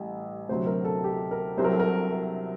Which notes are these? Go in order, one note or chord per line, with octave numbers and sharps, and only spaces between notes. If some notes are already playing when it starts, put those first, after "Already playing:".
Already playing: A1 A2 G3
D2 C3 F#3 C5
A#4
A4
G4
A#4
C2 C3 F#3 C5
A#4
A4
A#4
A#4